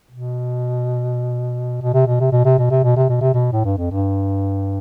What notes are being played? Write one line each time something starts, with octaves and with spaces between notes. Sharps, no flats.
B2
B2
C3
B2
C3
B2
C3
B2
C3
B2
C3
B2
C3
B2
A2
G2
F2
G2